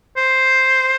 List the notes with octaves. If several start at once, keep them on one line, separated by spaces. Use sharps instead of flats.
C5